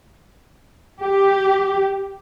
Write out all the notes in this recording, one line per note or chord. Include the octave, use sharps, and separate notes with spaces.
G4